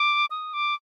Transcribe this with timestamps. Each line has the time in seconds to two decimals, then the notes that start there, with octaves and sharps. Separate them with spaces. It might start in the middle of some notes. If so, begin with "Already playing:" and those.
Already playing: D6
0.31 D#6
0.54 D6